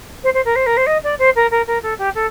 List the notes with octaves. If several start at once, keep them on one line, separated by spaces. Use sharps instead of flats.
C5
C5
A#4
C5
A#4
C5
D#5
D5
C5
A#4
A#4
A#4
A4
G4
A4